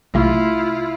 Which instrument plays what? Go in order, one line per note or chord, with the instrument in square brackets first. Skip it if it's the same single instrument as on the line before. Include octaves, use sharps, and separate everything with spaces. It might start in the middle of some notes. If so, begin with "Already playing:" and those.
[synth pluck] B1 C3 A3 [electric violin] E4 F4